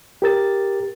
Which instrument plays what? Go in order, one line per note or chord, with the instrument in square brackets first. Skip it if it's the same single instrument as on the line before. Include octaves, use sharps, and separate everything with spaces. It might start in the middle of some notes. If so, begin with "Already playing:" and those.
[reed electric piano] G4 A#4 A6